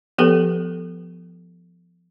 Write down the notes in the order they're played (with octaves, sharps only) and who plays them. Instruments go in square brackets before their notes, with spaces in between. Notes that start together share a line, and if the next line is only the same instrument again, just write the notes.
[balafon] F3 B3 G4 A4 B4 G5